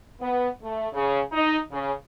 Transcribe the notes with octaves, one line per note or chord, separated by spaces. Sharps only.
B3
A3
C#3
D#4
C#3